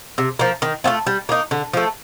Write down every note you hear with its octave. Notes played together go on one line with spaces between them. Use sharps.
C3
F3 A#3
D#3
A3 C4 F4
G3
A#3 D#4
D3
F3 A3